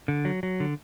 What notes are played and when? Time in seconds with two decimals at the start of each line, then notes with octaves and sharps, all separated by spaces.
0.08 D3
0.25 F#3
0.43 F#3
0.60 D3